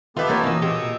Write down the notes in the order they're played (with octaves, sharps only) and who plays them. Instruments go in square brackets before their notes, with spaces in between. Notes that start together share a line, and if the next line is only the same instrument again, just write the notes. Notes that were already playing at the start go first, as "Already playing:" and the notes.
[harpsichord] D#3 [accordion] B3 G4 A4 [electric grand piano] F4 B4 E5
[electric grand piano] A#3 [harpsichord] D4 [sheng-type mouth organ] A#4 C#5
[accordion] B2 [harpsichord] E3 C#4 [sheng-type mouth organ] D#5 E6
[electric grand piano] A#2 [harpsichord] G4